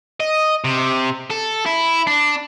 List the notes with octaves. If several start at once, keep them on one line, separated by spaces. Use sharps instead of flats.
D#5
C3
A4
E4
D4